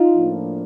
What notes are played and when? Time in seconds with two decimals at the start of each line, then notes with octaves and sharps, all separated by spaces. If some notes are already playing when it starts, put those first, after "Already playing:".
Already playing: D#4 F4
0.15 A2 F3 A#3 D4